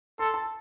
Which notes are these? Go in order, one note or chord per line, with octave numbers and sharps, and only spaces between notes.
A4 C6
A5